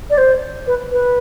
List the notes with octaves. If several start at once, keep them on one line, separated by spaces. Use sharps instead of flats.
D5
C5
B4
B4